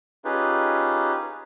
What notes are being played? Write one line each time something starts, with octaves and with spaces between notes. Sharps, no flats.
C#4 D#4 F4 G4 G#4 B4